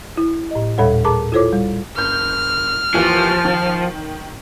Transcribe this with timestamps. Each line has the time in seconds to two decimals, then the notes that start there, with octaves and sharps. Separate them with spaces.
0.17 E4
0.51 A2 D#5
0.78 D#2 A#2 G3 A4 C#5 F#5
1.05 G#4 A#4 A5 A#5 D6
1.32 E4 F4 A4 C5 C#5 D6
1.53 G3
1.97 F#1 F6 G6
2.94 D#2 E3 F3
3.45 D#3